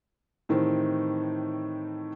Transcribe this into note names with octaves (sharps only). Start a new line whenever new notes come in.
A2 D#3 E3 C4 G4